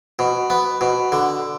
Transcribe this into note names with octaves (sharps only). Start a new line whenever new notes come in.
B2
B3
B2
D3